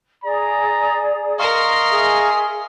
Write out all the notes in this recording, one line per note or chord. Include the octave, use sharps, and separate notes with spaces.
G#4 D5 A#5
A#4 D#5 F5 A#5 C6 C#6
G#4 E5